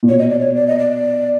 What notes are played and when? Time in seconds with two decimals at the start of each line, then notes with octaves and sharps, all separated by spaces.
0.03 A#2
0.09 B2 C#5
0.19 D#5
0.30 D5
0.40 C#5
0.55 D5
0.67 D#5
0.79 D5